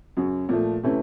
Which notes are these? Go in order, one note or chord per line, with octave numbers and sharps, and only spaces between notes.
F#2 C#3 F#3
A#2 F3 A3
C3 E3 A3 C#4